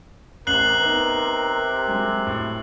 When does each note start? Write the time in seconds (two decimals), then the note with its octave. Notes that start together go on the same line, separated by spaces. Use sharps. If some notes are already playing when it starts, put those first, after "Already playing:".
0.47 A1 C3 A#4 F#6 C7 F#7
0.81 B3 D#4
1.88 F#3 G#3
2.27 A2